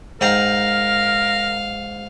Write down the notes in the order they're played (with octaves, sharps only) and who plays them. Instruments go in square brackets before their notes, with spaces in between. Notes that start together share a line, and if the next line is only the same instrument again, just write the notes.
[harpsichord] G#2 G5 A#5 [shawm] A#4 [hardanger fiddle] F5